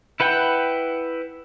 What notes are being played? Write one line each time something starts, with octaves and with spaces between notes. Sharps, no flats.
E4 B4 F#5 G5